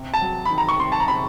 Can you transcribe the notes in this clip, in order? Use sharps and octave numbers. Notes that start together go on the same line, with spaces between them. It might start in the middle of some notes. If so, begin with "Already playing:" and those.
Already playing: C3
A5
F#3
D#3 B5
A#5
C#6
C3 C6
A5
A#5
C3 B5